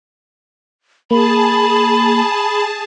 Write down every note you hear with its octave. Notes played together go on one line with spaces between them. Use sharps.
A#3 G#4 A5 B5